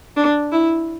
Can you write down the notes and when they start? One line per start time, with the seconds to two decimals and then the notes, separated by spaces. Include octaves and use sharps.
0.16 D4
0.52 E4